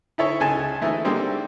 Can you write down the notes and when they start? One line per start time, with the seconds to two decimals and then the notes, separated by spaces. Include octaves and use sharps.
0.18 D#4 E4 A4 C#5
0.40 C#2 G#4 A4 G#5 A5
0.81 E3 A3 D#4
1.04 D3 G3 G#3 A#3 C4 D#4